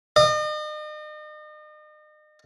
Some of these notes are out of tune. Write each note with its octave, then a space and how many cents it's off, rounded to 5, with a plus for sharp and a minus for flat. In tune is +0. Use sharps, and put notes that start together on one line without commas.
D#5 -40